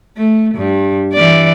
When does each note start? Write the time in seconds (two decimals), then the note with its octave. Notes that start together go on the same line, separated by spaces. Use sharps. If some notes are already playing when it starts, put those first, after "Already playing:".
0.17 A3
0.56 G2
1.14 E3 D5